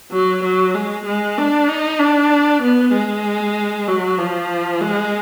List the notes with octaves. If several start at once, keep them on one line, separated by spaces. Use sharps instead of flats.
F#3
F#3
G#3
G#3
D4
D#4
D4
B3
G#3
F#3
F3
G#3